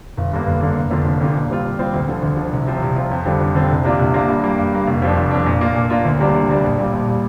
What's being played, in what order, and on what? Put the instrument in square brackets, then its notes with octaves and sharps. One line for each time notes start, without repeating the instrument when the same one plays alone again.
[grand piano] G1
G2 D3 A#3
G1
G2 D3 A#3
F1
F2 D3 A#3 F4
F1
F2 D3 A#3 F4
A#2
G3 C4 F4
A#2
G3 C4 F4
D2
D3 F3
D2
D3 F3
C2
C3 F3 C4 F4
C2
C3 F3 C4 F4
F2
D3 G3 C4 F4
F2
D3 G3 C4 F4
C2
C3 A#3 D4 F4
C2
C3 A#3 D4 F4
G2
G3 A#3
G2
G3 A#3
F1
F2 F3 D4
F1
F2 F3 D4
A#2
A#3 D4 F4
A#2
A#3 D4 F4
D2
C3 G3 A#3 D4
D2
C3 G3 A#3 D4
A#1
A#2 G3
A#1
A#2 G3